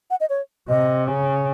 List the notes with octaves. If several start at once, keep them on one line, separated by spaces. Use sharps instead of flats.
F#5
D#5
C#5
C3 D#5
C#3